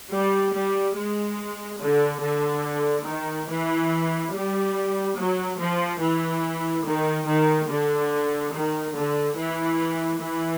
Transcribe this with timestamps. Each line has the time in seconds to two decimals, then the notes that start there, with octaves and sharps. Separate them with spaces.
0.11 G3
0.54 G3
0.96 G#3
1.80 D3
2.22 D3
3.06 D#3
3.49 E3
4.33 G3
5.17 F#3
5.59 F3
6.01 E3
6.85 D#3
7.27 D#3
7.69 D3
8.53 D#3
8.96 D3
9.37 E3
10.21 E3